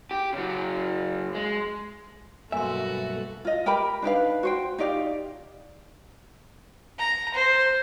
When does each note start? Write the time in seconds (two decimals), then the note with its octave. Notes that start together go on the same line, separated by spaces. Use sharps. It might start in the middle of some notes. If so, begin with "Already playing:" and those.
0.11 G4
0.33 C#3 F#3
1.35 G#3
2.52 B1 G2 A3 A#3 F#4 E5 G#5 C6
3.45 F4 D#5
3.66 G4 A#4 G5 B5
4.02 D4 D#4 B4 F5
4.43 F#4 C5 G5
4.78 D#4 G4 D5 F5
6.99 A#5
7.35 C5